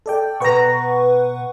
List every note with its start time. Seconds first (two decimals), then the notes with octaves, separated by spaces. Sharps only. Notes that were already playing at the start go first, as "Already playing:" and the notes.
0.06 A4 D5 G5
0.40 B2 B4 F#5 A#5 C#6